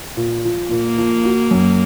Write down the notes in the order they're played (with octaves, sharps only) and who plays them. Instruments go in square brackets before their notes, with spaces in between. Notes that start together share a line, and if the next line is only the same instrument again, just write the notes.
[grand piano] A#2
F3
[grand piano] A#2 [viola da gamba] A#3
[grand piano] F3
F#4
F#2